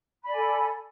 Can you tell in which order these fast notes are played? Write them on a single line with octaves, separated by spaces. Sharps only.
B5 D5 G#5 A4